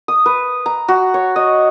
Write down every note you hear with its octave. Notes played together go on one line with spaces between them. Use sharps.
D#6
B4
A#5
F#4
C#5
D#5